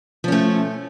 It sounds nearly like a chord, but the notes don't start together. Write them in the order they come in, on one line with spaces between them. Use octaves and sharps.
F3 C#4 A3